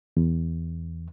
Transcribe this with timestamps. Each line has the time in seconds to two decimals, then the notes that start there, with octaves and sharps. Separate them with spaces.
0.17 E2